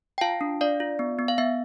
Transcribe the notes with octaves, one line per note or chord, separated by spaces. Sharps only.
G5
F4 F5 A5
D4
D4 D5 F5
F4
B3
B3
F5
B3 E5